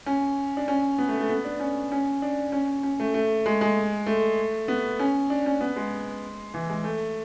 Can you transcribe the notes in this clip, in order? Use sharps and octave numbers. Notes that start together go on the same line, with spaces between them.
C#4
D4
C#4
B3
A3
A3
B3
D4
C#4
C#4
D4
C#4
C#4
A3
A3
G#3
G#3
A3
B3
C#4
D4
C#4
B3
G#3
E3
G#3
A3